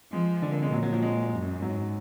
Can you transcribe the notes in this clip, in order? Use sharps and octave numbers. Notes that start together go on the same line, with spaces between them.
F3 G#3
D3 F3
A#3
G#3
A#2 F#3
F#3
F3
G#3
F#2
G#2 F#3